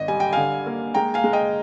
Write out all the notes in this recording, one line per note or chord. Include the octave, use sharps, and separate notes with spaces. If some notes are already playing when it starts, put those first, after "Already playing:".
Already playing: G#1 D#5
G3 G#5
G5
D3 F5 G#5
A#3
G#3 G5 A#5
F5 G#5
G#3
D#5 G5